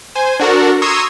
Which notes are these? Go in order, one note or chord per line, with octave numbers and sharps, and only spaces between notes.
C5 G#5
D4 F#4 A4 A#4
A#5 C6 C#6 D#6 E6 G#6